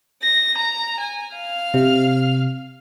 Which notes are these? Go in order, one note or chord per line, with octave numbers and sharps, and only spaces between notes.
A#6
A#5
G#5
F5 F6
C3